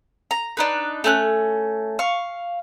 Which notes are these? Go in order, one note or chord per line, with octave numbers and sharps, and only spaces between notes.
A#5
D4 D#4 B4
A3 C#4 F#6
F5 C#6